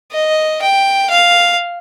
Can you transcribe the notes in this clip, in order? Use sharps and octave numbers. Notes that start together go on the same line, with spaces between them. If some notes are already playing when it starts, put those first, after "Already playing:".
D#5
G5
F5